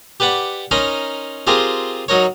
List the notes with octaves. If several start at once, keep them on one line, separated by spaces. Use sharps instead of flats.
G4 B4 D5 F#5 B5
C#4 D#4 A#4 B5 C6
C4 F4 G4 G#4 A#4
F#3 D#4 A#4 C#5